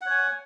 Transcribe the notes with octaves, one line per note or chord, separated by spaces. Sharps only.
C#5 F#5 G#5